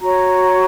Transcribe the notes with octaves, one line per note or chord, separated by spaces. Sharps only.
F#4 C#5 A#5